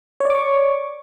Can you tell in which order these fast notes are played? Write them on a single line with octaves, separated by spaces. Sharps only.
C#5 D5 D6 C#6